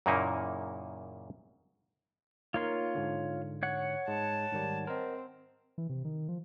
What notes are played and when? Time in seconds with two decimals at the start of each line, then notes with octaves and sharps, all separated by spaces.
0.06 F#2 A#2 C#3 A#3 D#4 E4
2.54 A#3 D#4 F4 A#4 C#5 C6
2.95 G#2 D3
3.63 C#5 F#5
4.08 G#2 G#3 A5
4.52 G#2 D#3 G3
4.87 C4 A#4 D#5
5.78 E3
5.89 C3
6.05 D#3
6.29 F3